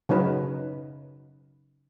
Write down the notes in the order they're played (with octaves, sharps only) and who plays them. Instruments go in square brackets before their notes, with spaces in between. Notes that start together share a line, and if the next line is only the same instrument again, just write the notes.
[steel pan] C#3 F#3 D#4 B4